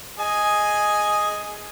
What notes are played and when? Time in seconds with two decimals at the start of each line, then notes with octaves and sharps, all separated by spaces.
0.19 G#4 D#5 G#5